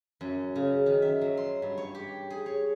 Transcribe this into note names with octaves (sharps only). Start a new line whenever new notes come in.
F#2
C#3
D#3
E5
F#3
C6
G2
C#5
G4
G#4
C#5